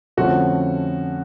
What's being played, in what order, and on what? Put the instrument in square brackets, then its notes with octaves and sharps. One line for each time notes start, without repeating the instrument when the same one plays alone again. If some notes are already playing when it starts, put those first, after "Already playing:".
[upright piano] F2 D3 F3 A3 C#4 [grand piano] F#4